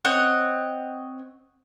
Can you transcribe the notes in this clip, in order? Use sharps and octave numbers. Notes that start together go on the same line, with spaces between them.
C4 C#5 D#5 F#5